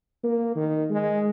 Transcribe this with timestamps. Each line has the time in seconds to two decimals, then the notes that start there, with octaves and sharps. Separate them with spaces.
0.24 A#3
0.55 D#3
0.90 G#3